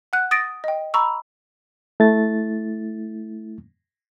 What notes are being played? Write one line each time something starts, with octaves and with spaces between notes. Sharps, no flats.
F#5 F#6
D#6 A6 A#6 D7
D#5 G5
A#5 B5 C#6 E6
A3 E4 A6